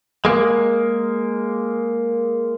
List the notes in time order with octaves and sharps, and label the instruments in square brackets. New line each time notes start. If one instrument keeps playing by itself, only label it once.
[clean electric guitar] G#3 A#3